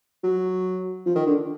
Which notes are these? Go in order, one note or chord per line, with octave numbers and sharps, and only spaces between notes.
F#3
F3
D#3
D3